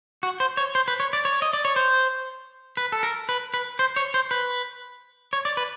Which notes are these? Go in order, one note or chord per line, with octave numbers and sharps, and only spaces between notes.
F#4
C5
C#5
C5
B4
C#5
D5
C#5
D#5
D5
C#5
C5
B4
A4
A#4
B4
B4
C5
C#5
C5
B4
C#5
D5
B4